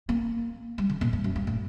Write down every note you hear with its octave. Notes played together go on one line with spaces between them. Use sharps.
A#3
G3
D3
A#2
G2
F#2
G2
A2